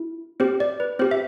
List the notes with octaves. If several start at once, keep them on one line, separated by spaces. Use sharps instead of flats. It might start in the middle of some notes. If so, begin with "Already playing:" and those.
Already playing: E4
C4 G4 C5
D5
B4
C4 G4 C5
E5